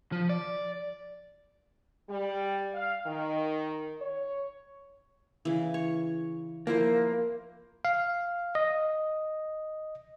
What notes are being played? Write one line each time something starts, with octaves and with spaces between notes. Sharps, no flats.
F3
D5
G3
F5
D#3
C#5
C#3 E3
C#5
F3 A#3 E4 C5
F5
D#5